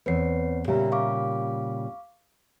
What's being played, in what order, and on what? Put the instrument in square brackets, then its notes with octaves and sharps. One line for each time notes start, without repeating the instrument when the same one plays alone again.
[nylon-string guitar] E2 C4 [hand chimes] B4 C#5 C7
[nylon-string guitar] A#2 C#3 G3 [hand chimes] G4 E5 A#5
[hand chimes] F5 C#6 D6